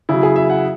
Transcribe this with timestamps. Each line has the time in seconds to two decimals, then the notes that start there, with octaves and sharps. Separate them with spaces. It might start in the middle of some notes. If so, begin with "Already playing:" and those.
0.09 C#3 F#3 E4
0.23 G#4
0.36 E5
0.50 F#5